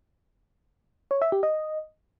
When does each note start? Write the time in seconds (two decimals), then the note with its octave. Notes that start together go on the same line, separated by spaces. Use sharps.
1.11 C#5
1.22 E5
1.32 G4
1.43 D#5